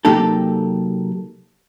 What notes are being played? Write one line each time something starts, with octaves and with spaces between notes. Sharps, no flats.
C3 F#3 A#3 D#4 G4 A4